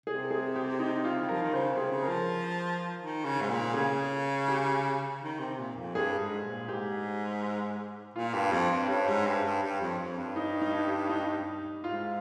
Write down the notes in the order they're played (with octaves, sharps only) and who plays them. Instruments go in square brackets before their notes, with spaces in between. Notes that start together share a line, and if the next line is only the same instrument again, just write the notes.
[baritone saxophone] C3 [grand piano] G#4
[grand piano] G#4
G4
D#4
F4
[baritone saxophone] G3
[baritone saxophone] F3 [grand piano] A#4
[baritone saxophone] D#3
[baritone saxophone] C#3 [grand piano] C5
[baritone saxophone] C3
[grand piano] G#4
[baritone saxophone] C#3
[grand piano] A#4
[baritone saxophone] F3
D#3
C#3
G#2
A#2
[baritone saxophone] C#3 [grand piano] G#4
[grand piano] G4
[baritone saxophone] D#3
C3
A#2
F2
[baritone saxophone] G2 [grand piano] G#4
[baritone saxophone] G#2
A#2
[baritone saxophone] G#2 [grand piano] G4
[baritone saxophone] A#2 [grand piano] F4
[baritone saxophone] G2
F2
G2
[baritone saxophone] G2 [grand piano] C#4
[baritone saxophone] G#2
G2
G2
G2
F2
F2
G2
[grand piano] D#4
D#4
G4
D#4
[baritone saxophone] G#2 [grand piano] F4